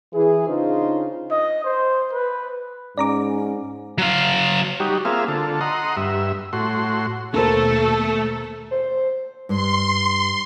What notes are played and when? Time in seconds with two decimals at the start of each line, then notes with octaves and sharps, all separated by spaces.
0.14 E3 E4 G#4
0.48 C#3 D4 D#4 F4 C5
1.31 D#5
1.64 C5
2.13 B4
2.98 G#2 C#4 D5 A#5 D6
3.98 F#3 F5
4.80 G3 D#4 F#4 G4
5.05 A#3 C4 F4 G#4 E5 F5
5.28 D3 F4 A4
5.61 D#5 F#5 A#5 C6
5.97 G2 E5
6.53 A2 F#4 C6
7.34 D#2 B2 A3 A#3 A4 A#4 C5
8.71 C5
9.49 G2 C6